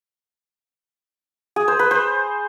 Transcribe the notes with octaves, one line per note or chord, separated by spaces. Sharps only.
G#4
C5
B4
C5